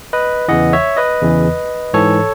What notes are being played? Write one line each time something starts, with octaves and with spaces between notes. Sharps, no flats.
B4 D#5
E2 C#3 E3 D#5 F#5
C#5 E5
B4 D#5
E2 C#3 E3
G#2 E3 A4 C#5